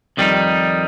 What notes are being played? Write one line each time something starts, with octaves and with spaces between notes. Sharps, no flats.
F2 D#3 G3 C4 D#4